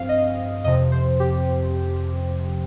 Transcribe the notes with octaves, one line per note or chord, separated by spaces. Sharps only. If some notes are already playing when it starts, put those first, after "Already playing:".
Already playing: G2 F3 C4 F5
D#5
F2 C3 F3 D#5
C5
G4